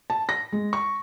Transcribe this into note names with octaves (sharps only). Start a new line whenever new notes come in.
A5
A#6
G#3
C#6